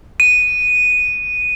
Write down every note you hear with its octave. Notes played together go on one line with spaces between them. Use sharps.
D#7